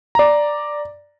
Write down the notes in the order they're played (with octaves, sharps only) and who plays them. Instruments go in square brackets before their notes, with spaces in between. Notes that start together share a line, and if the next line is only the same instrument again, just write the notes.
[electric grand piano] D5 A#5